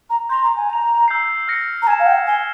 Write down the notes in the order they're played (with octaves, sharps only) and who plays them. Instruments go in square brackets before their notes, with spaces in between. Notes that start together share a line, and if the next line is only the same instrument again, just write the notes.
[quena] A#5
[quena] C6 [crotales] G6 A#6 F7
[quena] A#5
G#5
[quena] A#5 [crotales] G6 A#6 F7
[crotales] E6 G6 C7
F6 A#6 C#7
[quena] A#5
[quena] G#5 [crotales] F6 G#6 E7
[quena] F5
G5
[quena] G#5 [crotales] G#6 C7 G7